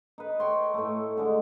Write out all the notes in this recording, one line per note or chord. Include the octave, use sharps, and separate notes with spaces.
D#4 B4
C#5 G5 C6
A2 A3
D3 G#3